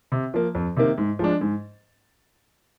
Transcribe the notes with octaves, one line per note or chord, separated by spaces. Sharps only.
C3
F3 A#3
F2
C3 D#3 A#3
G#2
F3 G#3 D4
G#2